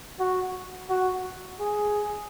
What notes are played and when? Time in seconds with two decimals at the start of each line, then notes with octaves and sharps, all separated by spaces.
0.20 F#4
0.90 F#4
1.60 G#4